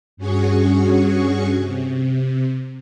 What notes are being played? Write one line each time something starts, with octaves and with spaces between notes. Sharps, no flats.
G2 C#4 F#4 G#4 C#6
C3